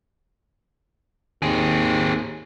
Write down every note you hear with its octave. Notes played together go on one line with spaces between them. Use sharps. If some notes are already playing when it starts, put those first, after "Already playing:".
D#2 C4 G#4